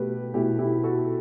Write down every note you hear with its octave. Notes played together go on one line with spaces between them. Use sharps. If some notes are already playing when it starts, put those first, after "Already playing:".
Already playing: B2 A3 G4 B4
B2 A3 E4 G4
E4 G4
F#4 A4